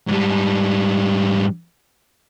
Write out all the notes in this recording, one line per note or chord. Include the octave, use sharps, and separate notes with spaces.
G#2 G3